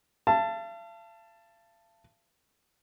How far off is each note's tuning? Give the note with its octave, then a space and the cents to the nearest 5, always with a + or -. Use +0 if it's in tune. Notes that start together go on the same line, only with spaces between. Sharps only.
F5 -45 A5 +10